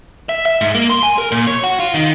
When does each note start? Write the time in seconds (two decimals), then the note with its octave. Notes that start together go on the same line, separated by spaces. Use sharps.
0.29 E5
0.46 E5
0.61 G#2
0.75 A#3
0.90 C6
1.03 G#5
1.18 A#4
1.32 A#2
1.47 C#5
1.64 F#4
1.80 F4
1.94 D#3